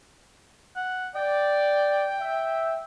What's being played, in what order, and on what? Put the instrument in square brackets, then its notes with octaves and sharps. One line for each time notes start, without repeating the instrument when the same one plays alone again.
[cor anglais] F#5
[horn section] D5 [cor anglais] G5
[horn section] E5